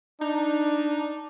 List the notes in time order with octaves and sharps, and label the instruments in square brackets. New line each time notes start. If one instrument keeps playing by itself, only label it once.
[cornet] D4 [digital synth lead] D#4